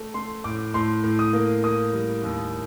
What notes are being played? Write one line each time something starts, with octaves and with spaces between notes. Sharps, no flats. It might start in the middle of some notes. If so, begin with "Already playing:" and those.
Already playing: A3
A3 C6
A2 D6
A2 C6
A2
D#6
A#3
A#3 D#6
G3
D#2